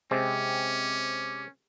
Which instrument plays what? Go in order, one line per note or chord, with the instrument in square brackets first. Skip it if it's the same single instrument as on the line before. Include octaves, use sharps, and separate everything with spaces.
[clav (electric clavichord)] C3 G#3 C4 [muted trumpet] C#4 [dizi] D6